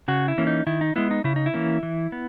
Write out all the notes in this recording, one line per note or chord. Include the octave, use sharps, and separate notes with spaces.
C#3 F#4
E4
E3 A#3 C#4
D#4
D#3 E4
D#4
G#3 B3 E4
D#4
C#3 E4
D#4
E4
E3 A#3 C#4
E3
B3